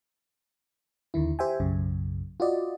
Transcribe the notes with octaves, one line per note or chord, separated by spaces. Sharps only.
D#2 D3 D#3 E4
G4 C5 E5 G5 G#5
B1 F#2 C#3
F4 F#4 D5 D#5